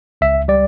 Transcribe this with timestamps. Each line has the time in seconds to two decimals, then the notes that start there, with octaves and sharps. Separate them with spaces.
0.21 C#2 E5
0.48 G3 D5